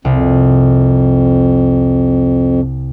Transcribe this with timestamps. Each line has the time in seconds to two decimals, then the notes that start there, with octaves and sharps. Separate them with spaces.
0.05 C2 F2